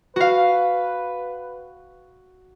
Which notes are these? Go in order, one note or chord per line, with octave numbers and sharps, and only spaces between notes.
F#4 B4 F5